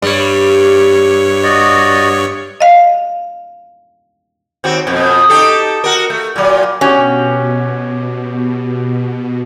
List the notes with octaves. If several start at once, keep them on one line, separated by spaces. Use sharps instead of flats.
G2 G3 C#5
F#4 D5 D#5
D#5 F5
D#2 C4 F#4
F2 B2
D#4 G4 A4
F#4 A#4
A3
A#2 F#3
B2 C#4 F#4 G4